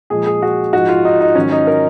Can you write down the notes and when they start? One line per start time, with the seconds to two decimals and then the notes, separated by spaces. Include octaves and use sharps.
0.10 A#2 F3 G#3 G#4
0.26 G#4
0.42 F#4
0.73 G#2 F3 G#3 F#4
0.89 F4
1.05 D#4
1.20 D#4
1.35 G#2 D#3 F#3 C#4
1.52 D#4
1.67 A#4